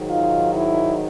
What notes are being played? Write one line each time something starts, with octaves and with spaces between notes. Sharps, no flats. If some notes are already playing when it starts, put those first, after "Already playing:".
Already playing: G#2 D#3 F#3
F4
E4